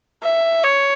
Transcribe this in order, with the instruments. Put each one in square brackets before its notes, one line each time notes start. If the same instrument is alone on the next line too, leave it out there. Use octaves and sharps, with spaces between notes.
[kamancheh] E5
C#5